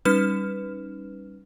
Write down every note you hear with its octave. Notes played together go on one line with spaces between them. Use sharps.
G3 C#4 D#4 B4 F6 E7